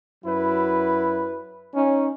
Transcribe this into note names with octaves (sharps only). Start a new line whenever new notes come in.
F#2 F#3 E4 B4
C#4 D#4